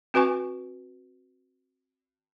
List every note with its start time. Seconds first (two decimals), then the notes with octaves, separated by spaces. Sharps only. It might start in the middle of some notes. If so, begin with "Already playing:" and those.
0.14 C4 F#4 B4 G#5 C#6